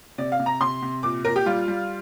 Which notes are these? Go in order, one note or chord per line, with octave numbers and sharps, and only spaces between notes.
C3 D5
F5
C3
A#5
C3 C6
C3
A#2 D6
A#2 A#4
G4
G3 F4
G3